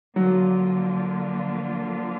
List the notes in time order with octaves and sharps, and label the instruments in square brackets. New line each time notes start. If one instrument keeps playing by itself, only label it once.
[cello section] D3 F3 A#3 D4 F4 [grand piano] F#3